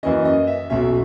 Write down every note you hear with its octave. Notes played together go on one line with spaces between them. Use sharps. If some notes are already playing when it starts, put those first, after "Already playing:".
F#2 E3 A#3 C#4 D#5
D#5
E5
B1 B2 F#3 C#4 E5